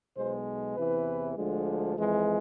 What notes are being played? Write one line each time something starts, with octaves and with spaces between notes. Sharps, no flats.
B1 B2 G#3 C5
E2 C3 E3 B4
D2 D3 F3 G#3
F2 E3 G#3